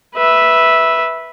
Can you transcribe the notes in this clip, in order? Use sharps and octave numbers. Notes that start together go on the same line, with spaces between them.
B4 E5